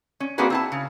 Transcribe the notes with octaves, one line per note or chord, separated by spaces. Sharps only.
C#4
A#3 C4 D4 F#4 G#4 B4
C4 E4 A5
C#3